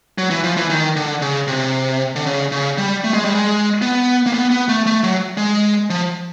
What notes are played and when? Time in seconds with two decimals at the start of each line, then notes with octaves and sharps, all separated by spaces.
0.18 F#3
0.31 E3
0.44 F3
0.57 E3
0.70 D#3
0.96 D3
1.22 C#3
1.47 C3
2.16 D3
2.26 C#3
2.52 C#3
2.78 G3
3.04 A3
3.14 G#3
3.25 G3
3.35 G#3
3.82 B3
4.26 A#3
4.34 B3
4.51 B3
4.69 A3
4.86 A3
5.04 F#3
5.38 G#3
5.90 F3